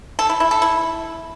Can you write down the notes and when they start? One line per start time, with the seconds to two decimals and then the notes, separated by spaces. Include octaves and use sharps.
0.19 A4
0.29 E4
0.40 E4
0.51 A4
0.62 E4